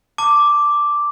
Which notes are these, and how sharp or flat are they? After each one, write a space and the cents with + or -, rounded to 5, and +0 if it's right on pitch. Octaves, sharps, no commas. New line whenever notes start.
A5 +35 D6 +0